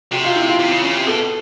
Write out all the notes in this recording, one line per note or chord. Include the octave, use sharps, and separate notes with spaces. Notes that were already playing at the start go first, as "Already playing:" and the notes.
C3 F#4
F4
E4
F4
C3
C#3
C#3
C3
B2 A4